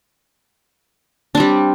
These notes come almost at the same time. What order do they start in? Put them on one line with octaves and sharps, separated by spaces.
D4 C4 G3